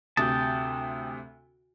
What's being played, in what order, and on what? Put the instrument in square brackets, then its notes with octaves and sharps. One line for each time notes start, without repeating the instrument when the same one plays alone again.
[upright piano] D2 C3 [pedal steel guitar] G5 A5 [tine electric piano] D#6